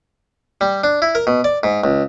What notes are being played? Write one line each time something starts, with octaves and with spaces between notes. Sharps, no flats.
G3
D4
E4
A#4
B2
D5
G#2
C#2